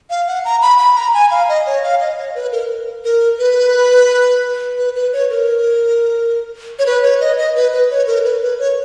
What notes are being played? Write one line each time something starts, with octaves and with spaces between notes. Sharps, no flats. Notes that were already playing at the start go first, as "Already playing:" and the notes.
F5
F#5
A#5
B5
B5
A#5
G#5
F5
D#5
C#5
F5
D#5
C#5
B4
A#4
A#4
B4
B4
B4
C#5
A#4
C#5
B4
C#5
D#5
D#5
B4
B4
C#5
A#4
B4
B4
C#5